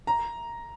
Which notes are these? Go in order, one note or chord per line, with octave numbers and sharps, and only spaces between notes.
A#5